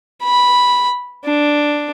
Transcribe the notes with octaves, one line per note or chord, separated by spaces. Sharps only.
B5
D4